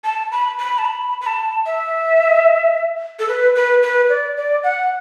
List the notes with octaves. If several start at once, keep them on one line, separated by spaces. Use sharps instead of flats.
A5
B5
B5
A5
B5
B5
A5
E5
A4
B4
B4
B4
D5
D5
F#5